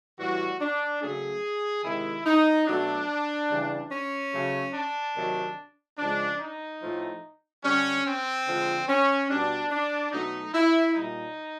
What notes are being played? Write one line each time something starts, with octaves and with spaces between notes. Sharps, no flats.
A2 E3 G3 F#4
D4
C#3 F#3 A3 G#4
C3 D#3 G#3 E4
D#4
B2 F#3 A3 D4
C#3 E3 G3
C#4
C#3 F#3 A3
D4
C3 D#3 F#3 A3
C#3 F3 G#3 D4
D#4
A2 F3 A3
D3 G3 C#4
C4
D3 F3 G#3
C#4
B2 G3 D4
D4
B2 F#3 A3 D#4
E4
A#2 G3 D#4